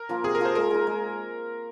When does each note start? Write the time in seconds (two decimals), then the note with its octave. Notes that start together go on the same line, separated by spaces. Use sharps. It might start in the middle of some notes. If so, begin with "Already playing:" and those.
Already playing: A#4
0.09 F3 A#3 F4
0.24 C3 G#4
0.35 A#4
0.40 F3 A#3 F4 C5
0.55 G#3 A#4
0.71 D#4 G#4
0.87 G#3